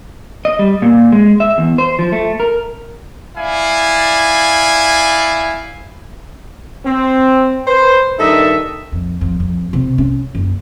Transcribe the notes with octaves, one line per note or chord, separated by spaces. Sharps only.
D#5
G3
A#2
G#3
E5
E2
C5
F3
A3
A#4
E4 D5 F5 G#5
C4
B4 C5
G2 D#3 D#4 A4 D#5 E5
F2
F2
F2
C3
C#4
F#1